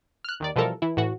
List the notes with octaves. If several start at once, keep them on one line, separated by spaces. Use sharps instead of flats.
F6 F#6
D#2 D#3 D5
B2 E3 F3 G3 A4 A#4
E3 E4
A2 E3 F#4